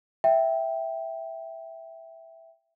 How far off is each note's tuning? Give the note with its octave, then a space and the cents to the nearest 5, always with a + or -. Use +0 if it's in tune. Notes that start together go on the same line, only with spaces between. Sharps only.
E5 +0 G5 +0